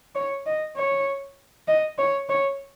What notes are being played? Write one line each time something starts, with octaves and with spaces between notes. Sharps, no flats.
C#5
D#5
C#5
D#5
C#5
C#5